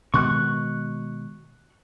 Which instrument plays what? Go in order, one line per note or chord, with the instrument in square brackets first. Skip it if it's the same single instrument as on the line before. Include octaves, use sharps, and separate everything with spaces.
[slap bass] B2 D#3 G#3 [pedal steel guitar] C#6 F#6